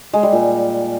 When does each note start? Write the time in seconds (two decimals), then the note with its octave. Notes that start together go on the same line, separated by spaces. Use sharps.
0.13 G#3
0.23 G3
0.33 A#2